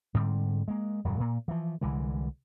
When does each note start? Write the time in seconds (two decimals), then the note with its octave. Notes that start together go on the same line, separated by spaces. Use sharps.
0.14 G#2 D3 G3 C4
0.68 G#3 A#3
1.04 D#1 F#2 F#3 G3
1.20 A#2 A#3
1.48 E3 F3
1.81 C2 D3 E3 G#3